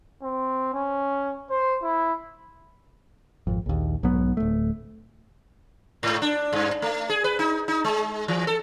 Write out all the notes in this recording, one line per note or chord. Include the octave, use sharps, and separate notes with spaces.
C4
C#4
C5
E4
G#1 F2
A#1 D#2
B1 G#2 F#3 B3
D1 A3
G#2
D4
G2
A3
G#4
B4
D#4
D#4
G#3
E3
A4